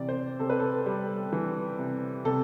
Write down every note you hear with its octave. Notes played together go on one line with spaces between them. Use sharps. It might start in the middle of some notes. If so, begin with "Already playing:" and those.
Already playing: C3 E3 D5
C5
C3 A4
B4
A4
G3
E3
C3
C3 A4